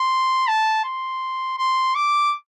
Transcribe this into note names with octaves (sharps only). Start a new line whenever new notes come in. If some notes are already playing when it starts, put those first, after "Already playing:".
Already playing: C6
A5
C6
C6
D6